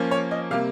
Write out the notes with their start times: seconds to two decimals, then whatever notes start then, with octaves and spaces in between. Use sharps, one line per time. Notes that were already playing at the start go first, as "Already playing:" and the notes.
Already playing: F3 A#3 C#4
0.11 C#5
0.31 D#5
0.51 C3 G3 A#3 F5